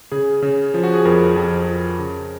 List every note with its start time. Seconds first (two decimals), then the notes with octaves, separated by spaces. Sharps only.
0.11 C#3 G#4
0.42 C#3
0.74 F3
0.83 F#4
0.94 G#4
1.05 F2 A#4
1.36 F2
1.67 F3
1.99 C#3